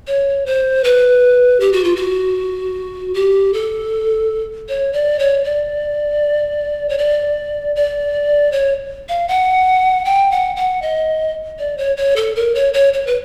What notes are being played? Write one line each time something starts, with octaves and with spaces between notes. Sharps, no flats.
C#5
C5
B4
G4
F#4
F4
F#4
G4
A4
C#5
D5
C#5
D5
C#5
D5
D5
C#5
F5
F#5
G5
F#5
F#5
D#5
D5
C#5
C#5
A4
A#4
C#5
C#5
C#5
B4